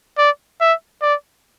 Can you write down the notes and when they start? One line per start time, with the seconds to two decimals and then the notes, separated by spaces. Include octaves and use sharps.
0.18 D5
0.61 E5
1.02 D5